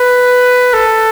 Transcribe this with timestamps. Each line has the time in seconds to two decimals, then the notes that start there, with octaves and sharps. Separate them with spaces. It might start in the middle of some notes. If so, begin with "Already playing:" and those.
Already playing: B4
0.74 A4